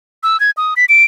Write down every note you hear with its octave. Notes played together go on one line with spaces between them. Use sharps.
E6
G#6
D#6
B6
D7